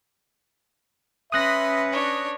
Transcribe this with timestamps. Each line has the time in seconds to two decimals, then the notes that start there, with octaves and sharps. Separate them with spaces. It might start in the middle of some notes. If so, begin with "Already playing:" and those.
1.32 C#4 B4 E5 B5 C6 D#6 F#6 A#6
1.92 D4 C#5